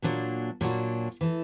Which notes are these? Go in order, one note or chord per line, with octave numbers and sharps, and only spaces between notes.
A#2 F#3 A#3 D4 F#4
A#2 F#3 A#3 D4 F#4
E3 A3